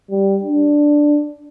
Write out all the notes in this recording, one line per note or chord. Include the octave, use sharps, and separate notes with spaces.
G3
D4